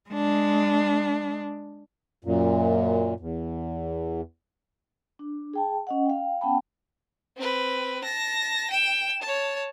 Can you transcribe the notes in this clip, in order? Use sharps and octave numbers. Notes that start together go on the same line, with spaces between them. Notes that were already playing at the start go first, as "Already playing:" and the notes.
G#3 D4
F#2 A#2
E2
D4
G#4 G5 A5
C#4 D#5 F#5
F5 G5
B3 C#4 F#5 G5 A5 B5
C4 B4
A5 A#6
G5 E7
C#5 A5